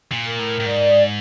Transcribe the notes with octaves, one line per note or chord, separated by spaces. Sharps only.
A#2
A#4
A2
A2
G#2 D5